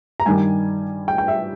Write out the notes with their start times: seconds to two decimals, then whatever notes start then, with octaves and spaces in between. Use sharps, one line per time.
0.20 A#5
0.26 G2 D#3 G3 G#5
1.08 G5
1.18 G5
1.28 E5